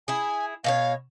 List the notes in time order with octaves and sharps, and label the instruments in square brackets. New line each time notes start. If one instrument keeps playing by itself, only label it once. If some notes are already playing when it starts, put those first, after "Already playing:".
[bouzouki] E4 G#4 [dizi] G#5
[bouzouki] B2 F#4 C#5 [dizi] F5